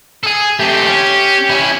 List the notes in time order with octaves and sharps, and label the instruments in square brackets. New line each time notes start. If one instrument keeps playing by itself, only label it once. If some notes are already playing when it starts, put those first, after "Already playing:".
[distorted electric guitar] G#4 A4
[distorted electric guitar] A3 C4 [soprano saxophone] G4
[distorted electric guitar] C#4
C#4 E4